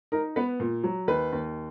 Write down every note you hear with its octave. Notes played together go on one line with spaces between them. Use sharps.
D#4 A#4
B3 B4
A#2
F#3
D#2 B4
D#2